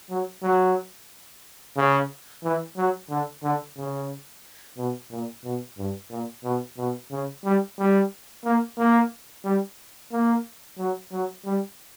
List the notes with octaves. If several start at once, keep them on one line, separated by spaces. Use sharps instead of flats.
F#3
F#3
C#3
E3
F#3
D3
D3
C#3
B2
A#2
B2
G2
A#2
B2
B2
C#3
G3
G3
A#3
A#3
G3
A#3
F#3
F#3
G3